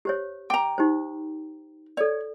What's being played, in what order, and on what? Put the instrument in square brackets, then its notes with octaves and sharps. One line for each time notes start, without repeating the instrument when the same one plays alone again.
[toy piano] G4 C5 C#5
[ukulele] G5 A#5 [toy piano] D6
[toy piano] D#4 G4 C5
[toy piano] A4 D5 [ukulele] C#5